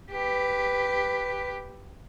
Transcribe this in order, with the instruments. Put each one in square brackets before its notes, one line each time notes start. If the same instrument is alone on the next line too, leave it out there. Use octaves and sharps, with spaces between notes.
[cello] G4 B4